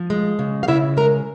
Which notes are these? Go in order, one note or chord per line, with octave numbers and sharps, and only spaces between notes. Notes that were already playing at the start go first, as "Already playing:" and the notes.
Already playing: F3
G#3
C#3
F5
C#3 E4 E5
G#3 A#4 A#5